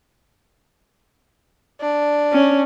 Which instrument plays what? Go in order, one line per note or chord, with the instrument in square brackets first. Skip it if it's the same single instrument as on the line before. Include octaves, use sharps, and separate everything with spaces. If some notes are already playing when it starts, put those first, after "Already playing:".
[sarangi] D4
[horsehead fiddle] C#4